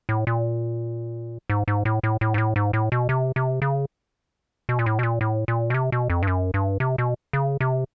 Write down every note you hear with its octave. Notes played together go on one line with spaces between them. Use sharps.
A2
A#2
G#2
G#2
A2
A2
A2
G#2
A2
G#2
A2
B2
C3
C3
C#3
B2
A#2
A2
B2
A#2
A2
A#2
B2
C3
B2
F2
G2
F#2
G2
C3
B2
C#3
C3